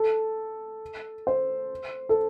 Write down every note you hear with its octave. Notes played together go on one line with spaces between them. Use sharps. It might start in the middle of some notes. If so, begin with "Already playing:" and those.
Already playing: A4
C5
A4